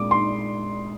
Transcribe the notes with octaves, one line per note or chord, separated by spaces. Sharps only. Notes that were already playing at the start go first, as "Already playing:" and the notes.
Already playing: A#2 G#3 D4 D6 D#6
C6